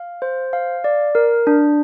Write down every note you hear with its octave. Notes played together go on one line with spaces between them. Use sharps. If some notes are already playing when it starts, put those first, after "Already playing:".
Already playing: F5
C5
F5
D5
A#4
D4